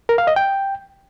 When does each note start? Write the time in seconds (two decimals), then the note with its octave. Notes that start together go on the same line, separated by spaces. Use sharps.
0.09 A#4
0.18 F5
0.27 D#5
0.36 G5